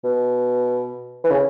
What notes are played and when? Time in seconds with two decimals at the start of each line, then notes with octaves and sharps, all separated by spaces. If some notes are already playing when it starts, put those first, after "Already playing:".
0.04 B2
1.24 E3
1.31 C#3